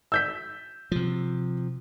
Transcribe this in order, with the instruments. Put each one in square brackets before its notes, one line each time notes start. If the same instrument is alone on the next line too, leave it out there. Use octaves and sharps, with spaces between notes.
[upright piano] E6 G6 B6
[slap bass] C3 F3